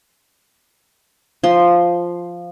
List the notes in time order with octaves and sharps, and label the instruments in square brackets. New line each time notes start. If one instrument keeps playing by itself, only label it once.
[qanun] F3 C6